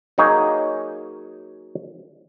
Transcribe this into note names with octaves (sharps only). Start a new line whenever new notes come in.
F#3 A#3 D#4 G#4 C#5 D#5